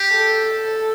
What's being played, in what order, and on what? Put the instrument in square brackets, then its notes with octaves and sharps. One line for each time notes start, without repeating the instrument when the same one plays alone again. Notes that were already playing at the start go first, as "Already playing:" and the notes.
Already playing: [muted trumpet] G4
[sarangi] A4